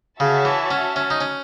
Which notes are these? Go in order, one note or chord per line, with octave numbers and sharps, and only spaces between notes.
C#3 F#4 C#5 E5 A5
E3
C#4
C#4
D#4
C#4